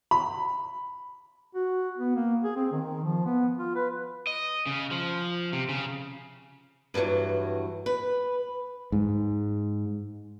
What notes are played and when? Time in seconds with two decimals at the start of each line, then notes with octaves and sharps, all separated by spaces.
0.11 B5
1.55 F#4
1.98 B3
2.16 A#3
2.44 G#4
2.56 C4
2.72 D#3
3.04 F3
3.26 B3
3.58 F4
3.75 B4
4.27 D#5
4.67 C#3
4.91 F3
5.53 C3
5.69 C#3
6.94 G2 C3 D#3 E3 F#3
7.86 B4
8.92 G#2